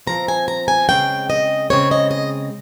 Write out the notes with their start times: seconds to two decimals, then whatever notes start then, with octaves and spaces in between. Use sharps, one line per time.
0.07 F3 C4 A#5
0.28 G#5
0.48 A#5
0.68 G#5
0.89 C#3 G#3 C4 G5
1.30 D#5
1.70 C#3 G#3 C4 C#5
1.91 D#5
2.11 D#5